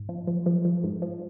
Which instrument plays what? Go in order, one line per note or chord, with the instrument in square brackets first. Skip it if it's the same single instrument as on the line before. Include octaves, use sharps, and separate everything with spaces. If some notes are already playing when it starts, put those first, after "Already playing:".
Already playing: [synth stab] G#2
F3
F3
F3
F3
G#2
F3